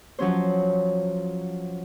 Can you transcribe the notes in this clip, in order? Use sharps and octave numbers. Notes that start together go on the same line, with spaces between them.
F3 F#3 C#4 C5